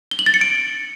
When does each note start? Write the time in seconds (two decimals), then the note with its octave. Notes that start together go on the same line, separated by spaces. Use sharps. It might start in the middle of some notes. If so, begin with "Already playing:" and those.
0.11 G7
0.19 F#7
0.26 A6
0.34 C#7
0.41 D7